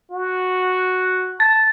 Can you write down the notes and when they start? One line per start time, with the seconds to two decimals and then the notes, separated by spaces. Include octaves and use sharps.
0.11 F#4
1.40 A5 A6